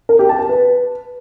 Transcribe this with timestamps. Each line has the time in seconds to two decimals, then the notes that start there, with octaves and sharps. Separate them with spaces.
0.09 A#4
0.19 G4
0.29 A5
0.39 A5
0.49 B4